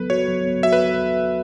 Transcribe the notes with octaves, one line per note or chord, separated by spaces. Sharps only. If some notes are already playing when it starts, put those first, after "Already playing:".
Already playing: F#3 B3 A4 B4
F#4 C#5
F#3
B3
F#4 E5
B4